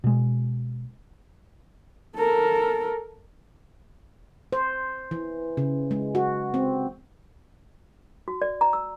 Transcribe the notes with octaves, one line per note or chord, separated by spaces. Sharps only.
B2 G#3
A4 A#4
C5
E3
C#3
G#3
F#4
C4
F#4
D5
A#5
E6